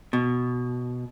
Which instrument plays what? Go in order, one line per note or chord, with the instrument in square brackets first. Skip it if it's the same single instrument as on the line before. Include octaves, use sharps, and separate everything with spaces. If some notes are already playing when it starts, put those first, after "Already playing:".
[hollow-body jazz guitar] B2